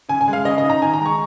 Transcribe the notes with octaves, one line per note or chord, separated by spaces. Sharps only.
C#3 G#5
G#5
G#3
F5
C#3 D#5
D#5
D#4
A#5
D#3 G#5
A#5
G#3
C#6